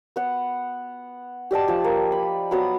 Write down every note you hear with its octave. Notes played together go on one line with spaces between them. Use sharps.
B3 F#5
G4 D5 D#5 A5
F3 G5
A#3
B5
F#3 B3 D#6